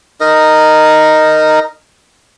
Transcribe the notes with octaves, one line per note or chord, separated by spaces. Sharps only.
D#4 A#4 D#5